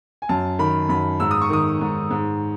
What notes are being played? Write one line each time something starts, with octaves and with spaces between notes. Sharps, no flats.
G#5
F#2 A5
D#3 B5
F#2 B5
G#2 E6
D#6
C#6
D#3 D#6
G#2
G#2